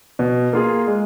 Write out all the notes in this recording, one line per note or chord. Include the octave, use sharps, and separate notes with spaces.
B2
A#3 F4 G#4
G#3